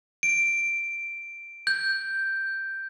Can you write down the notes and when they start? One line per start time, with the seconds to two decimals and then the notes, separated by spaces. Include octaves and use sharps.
0.23 D7
1.67 G6